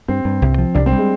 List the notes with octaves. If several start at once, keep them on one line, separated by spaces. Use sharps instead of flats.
G2 C4
G2
C2
F3
C2 D4
C4
G3
G#3